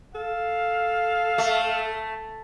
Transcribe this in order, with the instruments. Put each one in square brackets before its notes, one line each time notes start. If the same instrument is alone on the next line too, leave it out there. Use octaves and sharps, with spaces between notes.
[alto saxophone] A4 [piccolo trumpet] F5
[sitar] A3